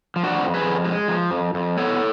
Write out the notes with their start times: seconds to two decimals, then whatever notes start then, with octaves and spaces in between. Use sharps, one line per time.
0.16 F3
0.23 D4 F#4
0.39 F2
0.54 G#4 B4
0.62 F2
0.84 G#3
1.08 F3
1.31 F2
1.54 F2
1.77 B3 A4 C#5